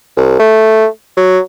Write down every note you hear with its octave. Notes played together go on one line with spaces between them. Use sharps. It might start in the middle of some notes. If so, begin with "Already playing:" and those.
C2
A3
F#3